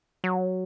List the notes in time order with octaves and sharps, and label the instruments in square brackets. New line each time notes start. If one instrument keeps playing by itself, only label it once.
[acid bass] F#3